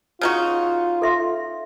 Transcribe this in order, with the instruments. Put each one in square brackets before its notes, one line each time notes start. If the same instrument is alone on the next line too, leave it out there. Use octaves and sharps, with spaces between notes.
[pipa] C#3 D#4 F#4 [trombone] F4
[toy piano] A4 E5 C6